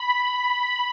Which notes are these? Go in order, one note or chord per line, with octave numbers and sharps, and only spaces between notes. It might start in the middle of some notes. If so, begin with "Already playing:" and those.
Already playing: B5